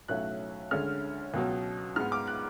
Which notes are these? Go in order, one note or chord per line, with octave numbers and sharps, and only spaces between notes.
B1 A2 F#3 A3 C#4 F#6
D2 D3 G#3 C#4 F6
C#2 B2 F#3
G#2 G#3 B3 F6
D6
F#6